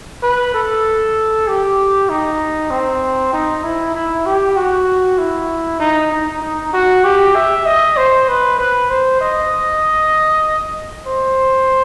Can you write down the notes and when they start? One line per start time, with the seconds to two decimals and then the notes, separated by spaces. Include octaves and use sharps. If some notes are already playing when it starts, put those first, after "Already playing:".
0.23 B4
0.54 A4
1.47 G4
2.09 D#4
2.70 C4
3.33 D#4
3.63 E4
3.95 E4
4.26 G4
4.57 F#4
5.18 E4
5.80 D#4
6.11 D#4
6.42 D#4
6.73 F#4
7.04 G4
7.35 E5
7.66 D#5
7.97 C5
8.28 B4
8.58 B4
8.90 C5
9.21 D#5
11.06 C5